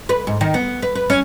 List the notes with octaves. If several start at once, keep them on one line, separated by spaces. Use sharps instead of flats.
B4
G#2
D#3
B3
B4
B4
C#4